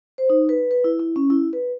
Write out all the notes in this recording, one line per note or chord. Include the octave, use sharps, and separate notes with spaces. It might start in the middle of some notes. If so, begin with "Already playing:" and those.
C5
D#4
B4
B4
E4
E4
C#4
E4
B4